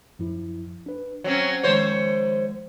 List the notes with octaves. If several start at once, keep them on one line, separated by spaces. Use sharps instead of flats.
F#2 F3 E4
D4 B4
F#3 C4 C#4 C#5
D#2 F3 G#3 C5 C#5